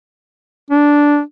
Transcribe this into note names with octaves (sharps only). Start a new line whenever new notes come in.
D4